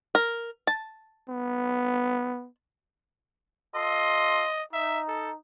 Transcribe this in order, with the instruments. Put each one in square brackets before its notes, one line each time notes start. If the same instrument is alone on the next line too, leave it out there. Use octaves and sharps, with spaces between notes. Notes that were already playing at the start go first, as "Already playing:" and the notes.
[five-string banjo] A#4
A5
[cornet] B3
[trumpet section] F4 A4 C6 [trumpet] D#5
[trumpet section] D#4 [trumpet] E5
[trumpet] A4